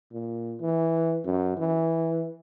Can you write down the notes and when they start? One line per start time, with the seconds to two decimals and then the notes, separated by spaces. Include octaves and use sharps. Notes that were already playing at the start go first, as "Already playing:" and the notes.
0.13 A#2
0.61 E3
1.25 F#2
1.58 E3